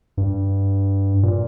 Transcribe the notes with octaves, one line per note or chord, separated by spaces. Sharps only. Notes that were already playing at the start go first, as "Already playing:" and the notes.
G2
A#2